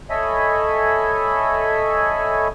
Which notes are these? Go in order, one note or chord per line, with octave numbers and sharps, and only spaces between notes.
A4 C#5 D#5 E5 G#5 B5